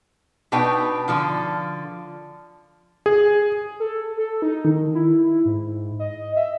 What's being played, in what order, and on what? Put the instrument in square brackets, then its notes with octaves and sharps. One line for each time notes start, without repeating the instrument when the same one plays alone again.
[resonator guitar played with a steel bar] B2 D4 D#4 B4 G5 G#5
D3 F3 F4
[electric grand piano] G#4
[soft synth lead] A4
A4
D#4
D#3
E4
G#2
D#5
E5